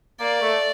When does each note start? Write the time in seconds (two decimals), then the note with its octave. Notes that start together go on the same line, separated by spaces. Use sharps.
0.20 A#3 D5
0.41 A3